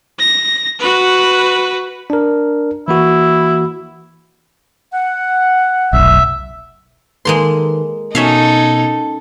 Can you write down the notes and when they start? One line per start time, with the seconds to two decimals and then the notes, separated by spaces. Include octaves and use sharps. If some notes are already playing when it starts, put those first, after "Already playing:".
0.19 A#6
0.80 F#4 B4
2.10 D4 A#4
2.88 E3 A#3 E4 F#4
4.93 F#5
5.93 F1 B1 E5
7.25 D#3 G#3 A#3 A4 B4 C6
8.15 B2 C#4 D#4 A4 E5 F5 A5 G#6